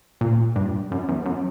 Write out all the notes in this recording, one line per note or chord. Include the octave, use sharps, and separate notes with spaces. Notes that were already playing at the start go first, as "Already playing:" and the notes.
A#2
G2
F#2
E2
F#2